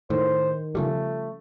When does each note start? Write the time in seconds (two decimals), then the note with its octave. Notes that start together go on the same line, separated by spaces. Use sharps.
0.10 A2 D#3 C5
0.75 C#3 F3 G3 A3